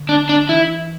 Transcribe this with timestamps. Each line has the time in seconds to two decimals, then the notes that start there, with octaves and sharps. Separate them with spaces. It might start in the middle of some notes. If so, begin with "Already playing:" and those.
Already playing: D3
0.09 D4
0.29 D4
0.49 E3 E4